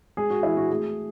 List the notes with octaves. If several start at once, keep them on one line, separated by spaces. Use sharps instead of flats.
G#3 G#4
F#4
E3 E4
F#4
A3 G#4